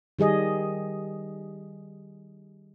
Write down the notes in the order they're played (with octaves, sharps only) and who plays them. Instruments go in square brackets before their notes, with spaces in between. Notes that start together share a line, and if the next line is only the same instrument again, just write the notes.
[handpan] D#3 G3 G#4 D#5